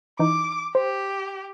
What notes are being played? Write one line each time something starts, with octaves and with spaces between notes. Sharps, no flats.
E3 D#4 D6
G4 C5